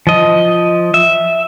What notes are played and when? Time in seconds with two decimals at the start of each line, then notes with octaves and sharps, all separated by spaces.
0.07 F3 D#5
0.94 E5